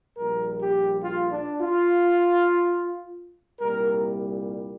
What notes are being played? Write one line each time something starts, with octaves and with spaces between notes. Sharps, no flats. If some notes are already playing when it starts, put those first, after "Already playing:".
A#1 A#2 G3 A#4
G4
F4
D4
F4
C2 A#2 G3 A#4